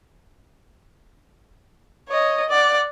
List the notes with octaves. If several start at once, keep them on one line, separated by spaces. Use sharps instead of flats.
C#5 D#5
D5 F#5